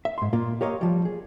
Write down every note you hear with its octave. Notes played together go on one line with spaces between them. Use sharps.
E5
G#2 C6
A#2 A#3 F4
G4 A#4 C#5 D#5 F5
F3 G3
G#4